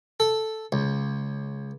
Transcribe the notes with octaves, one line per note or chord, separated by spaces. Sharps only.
A4
C#2